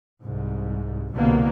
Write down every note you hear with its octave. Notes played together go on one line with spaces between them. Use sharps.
C2 G#2
C2 B2 D3 A#3 B3